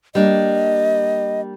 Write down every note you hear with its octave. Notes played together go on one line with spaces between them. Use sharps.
G3 A#3 D4 D#5